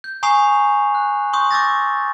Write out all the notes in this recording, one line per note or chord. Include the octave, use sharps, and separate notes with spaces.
G6
G#5 A#5 C#6 D#6 C7 F7
F#6
C6 C#6 D#6 G6
D6 E6 G6 A6 A#6